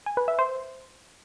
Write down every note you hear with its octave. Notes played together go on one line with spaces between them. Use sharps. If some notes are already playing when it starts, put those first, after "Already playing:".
G#5
B4
E5
C5